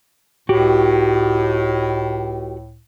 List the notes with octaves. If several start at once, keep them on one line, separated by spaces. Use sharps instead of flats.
C#2 A2 F#4 G4